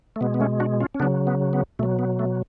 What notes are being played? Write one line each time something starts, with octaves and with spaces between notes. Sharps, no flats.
A3
B2 G#3 B3
B3
A3 C#4
D4 F#4
C#4 F4
C#4
C#3 F#3 B3 D4
B3
B3
B2 F#3 A3
B3
A3